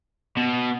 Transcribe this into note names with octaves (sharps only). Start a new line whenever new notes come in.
B2